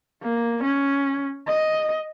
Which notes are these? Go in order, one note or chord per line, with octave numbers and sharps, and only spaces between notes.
A#3
C#4
D#5